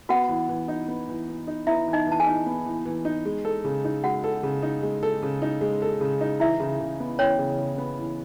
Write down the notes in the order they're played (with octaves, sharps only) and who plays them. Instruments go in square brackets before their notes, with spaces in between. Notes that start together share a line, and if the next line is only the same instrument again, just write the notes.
[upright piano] B3 [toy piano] F#4 F#5
[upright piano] E3
E3
D#4
B3
E3
E3
D#4
[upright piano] B3 [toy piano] E4 E5
[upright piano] E3
[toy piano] D#4 D#5
[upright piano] E3 [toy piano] A5
[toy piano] G#4 G#5
[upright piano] D#4
B3
E3
E3
D#4
G#3
A4
C#3
D#4
[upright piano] G#3 [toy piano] F#4 F#5
[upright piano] A4
C#3
D#4
G#3
A4
C#3
D#4
G#3
A4
C#3
D#4
[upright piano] E3 [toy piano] E4 E5
[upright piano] C#3
C#3
B3
[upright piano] E3 [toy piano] C#4 C#5
[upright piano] C#3
C#3
B3
E3